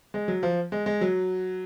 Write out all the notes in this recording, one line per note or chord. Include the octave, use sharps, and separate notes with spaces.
G#3
F#3
F3
G#3
G#3
F#3